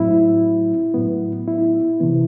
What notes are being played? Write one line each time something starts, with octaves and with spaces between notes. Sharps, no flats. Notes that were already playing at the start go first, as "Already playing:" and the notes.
Already playing: A2 F#3 C4 E4
A2 F#3 B3
E4
C3 E3 B3